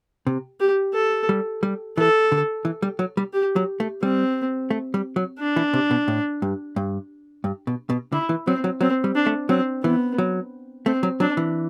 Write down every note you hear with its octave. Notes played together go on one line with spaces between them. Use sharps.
C3
G4
A4
G3
G3
E3 A4
D3
E3
G3
F#3
G3
G4
F#3
A3
G3 C4
A3
G3
F#3
D4
E3
C3
B2
A2
G2
G2
G2
B2
B2
D3 E4
E3
F#3 C4
F#3
F#3 C4
G3
D4
A3
F#3 C4
E3 B3
F#3
A3 C4
F#3
F#3 D4
E3